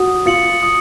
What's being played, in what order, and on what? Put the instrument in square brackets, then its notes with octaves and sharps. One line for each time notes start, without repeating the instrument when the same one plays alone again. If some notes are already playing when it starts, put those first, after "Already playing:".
Already playing: [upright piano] F#4 [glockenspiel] D#6
[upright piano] F4 [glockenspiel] A6 C#7 F#7
[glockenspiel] D#6